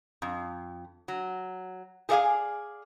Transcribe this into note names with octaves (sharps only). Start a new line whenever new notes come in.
F2
F#3
G#4 A4 D5 E5 F5 G#5